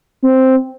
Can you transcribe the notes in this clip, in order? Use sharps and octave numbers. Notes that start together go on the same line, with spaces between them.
C4